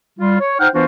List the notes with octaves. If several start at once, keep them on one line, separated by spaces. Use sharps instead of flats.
G3 F4
C#5
D#4 C5 F#5 G5 F6
E3 B3 D4 F4 F#4 C5